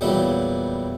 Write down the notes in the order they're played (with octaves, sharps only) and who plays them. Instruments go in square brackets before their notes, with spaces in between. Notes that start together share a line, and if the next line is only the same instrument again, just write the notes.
[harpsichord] E2 A#2 F#3 G3 E4